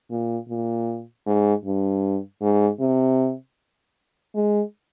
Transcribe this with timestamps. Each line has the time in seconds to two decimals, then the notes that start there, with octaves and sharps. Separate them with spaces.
0.10 A#2
0.49 A#2
1.27 G#2
1.65 G2
2.41 G#2
2.80 C3
4.34 G#3